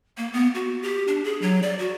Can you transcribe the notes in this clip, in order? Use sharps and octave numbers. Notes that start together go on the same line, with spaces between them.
A#3
B3
F#4
G4
D4
G#4
F#3
D5
F#4